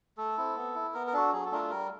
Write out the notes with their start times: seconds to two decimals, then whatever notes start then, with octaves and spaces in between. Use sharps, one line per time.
0.18 A3 A4
0.37 C4 E4
0.56 B3
0.75 E4
0.94 B3 A#4
1.07 A#4
1.13 D4 F#4 A4
1.33 F#3 G#4
1.46 A4
1.52 A3 D4 F4 A#4
1.58 A4
1.70 G3 A#4